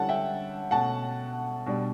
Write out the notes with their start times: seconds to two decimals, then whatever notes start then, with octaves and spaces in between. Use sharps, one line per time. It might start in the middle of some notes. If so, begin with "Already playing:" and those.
Already playing: D3 G3 C#4 E4 F#5 A5
0.09 E5 G5
0.71 B2 A3 C#4 F#5 A5
1.66 B2 G3 D4